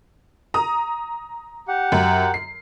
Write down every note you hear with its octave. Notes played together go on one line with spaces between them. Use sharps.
A#5 D#6
G4 F#5
F#2
C7